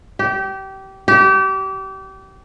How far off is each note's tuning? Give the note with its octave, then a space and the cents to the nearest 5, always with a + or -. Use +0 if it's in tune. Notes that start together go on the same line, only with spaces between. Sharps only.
G4 -25
G4 -30